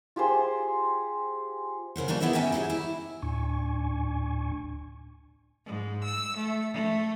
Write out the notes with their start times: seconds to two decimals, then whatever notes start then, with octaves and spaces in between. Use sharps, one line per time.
0.16 F4 G4 G#4 C5
1.96 C#3 A#4 C5 F#5
2.08 A#3 D4 D#4 F#4 G4
2.20 B3 E4 G#4 A#4 E5
2.33 G#2 C#4 D#4 E5 F#5 G5
2.52 E4 G4 G#4 C#5
2.70 E4
3.22 D2 A2 D4 G#5 C#6
5.66 G#2
6.03 E6
6.37 A3
6.73 A3